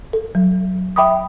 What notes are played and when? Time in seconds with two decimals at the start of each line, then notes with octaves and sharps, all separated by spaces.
0.13 A4
0.35 F#3
0.96 E5 G5 B5 D6 D#6